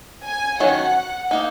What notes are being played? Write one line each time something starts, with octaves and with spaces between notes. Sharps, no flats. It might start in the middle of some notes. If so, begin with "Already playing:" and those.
G#5
D#3 F#3 C#4 F#5
A#3 D#4